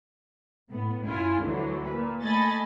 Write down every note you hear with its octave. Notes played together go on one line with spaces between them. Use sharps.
A2 B3
F#2 E4 F4 G#5
D2 D3 E3 F#3
A#2 B4
A3 A4 D#5 G#5 B5 A6